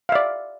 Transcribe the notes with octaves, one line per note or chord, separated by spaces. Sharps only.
D5 E5 F5